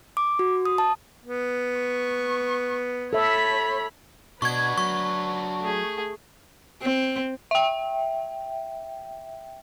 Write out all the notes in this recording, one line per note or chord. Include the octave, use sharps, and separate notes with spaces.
D6
F#4
D#6
A5
B3
C#6
A4 C#5 E5 B5
B2 D4 F#4 B4 C#6 G#6
F#3 C#6
A3 G#4
C4
E5 G5